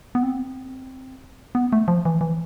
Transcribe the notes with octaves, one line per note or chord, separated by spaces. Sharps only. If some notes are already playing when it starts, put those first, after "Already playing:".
B3
C4
B3
A3
F3
E3
E3